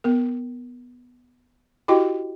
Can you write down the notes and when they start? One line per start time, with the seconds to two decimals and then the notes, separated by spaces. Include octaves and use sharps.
0.04 B3 A#4
1.88 E4 F#4 G4 D#5 G5